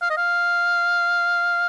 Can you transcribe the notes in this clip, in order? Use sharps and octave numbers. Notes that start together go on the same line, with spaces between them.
F5
D#5
F5